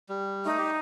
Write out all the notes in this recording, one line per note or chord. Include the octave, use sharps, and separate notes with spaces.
G3
A3 D#4
G4